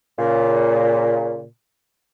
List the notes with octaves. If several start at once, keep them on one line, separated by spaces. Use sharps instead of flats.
A#2 C#3